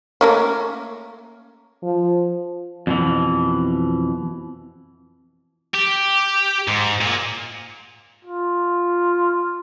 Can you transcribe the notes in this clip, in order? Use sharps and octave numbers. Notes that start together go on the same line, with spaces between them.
A3 A#3 C#4
F3
F2 B2 E3
G4
G#2
A#2
F4